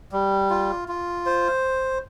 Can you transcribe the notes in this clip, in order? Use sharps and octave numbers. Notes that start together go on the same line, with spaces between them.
G3
F4
F4
C5